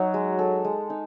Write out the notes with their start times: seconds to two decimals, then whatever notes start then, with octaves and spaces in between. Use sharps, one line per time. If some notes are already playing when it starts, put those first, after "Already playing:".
Already playing: F#3 D#4
0.14 G#3
0.39 A4
0.65 G#3
0.90 D#4